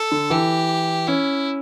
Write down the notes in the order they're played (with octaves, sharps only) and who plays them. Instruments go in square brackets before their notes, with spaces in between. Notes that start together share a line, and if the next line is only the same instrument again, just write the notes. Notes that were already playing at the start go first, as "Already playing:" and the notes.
Already playing: [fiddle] A4
[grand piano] D3
[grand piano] E3 [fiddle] G4
[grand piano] C#4 [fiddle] E4